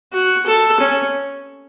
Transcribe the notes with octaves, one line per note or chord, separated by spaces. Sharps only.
F#4
A4
C#4